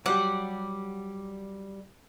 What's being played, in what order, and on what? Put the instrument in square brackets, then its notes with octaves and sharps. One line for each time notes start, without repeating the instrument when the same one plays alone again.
[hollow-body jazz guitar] F#3 G3 G4 [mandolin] D5 F#5